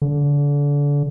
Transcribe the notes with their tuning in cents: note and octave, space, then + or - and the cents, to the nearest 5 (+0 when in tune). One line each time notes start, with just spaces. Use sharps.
D3 -30